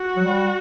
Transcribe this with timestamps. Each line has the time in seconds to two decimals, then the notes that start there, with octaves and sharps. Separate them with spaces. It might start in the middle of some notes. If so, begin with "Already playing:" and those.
Already playing: F#4
0.16 F#3
0.25 G3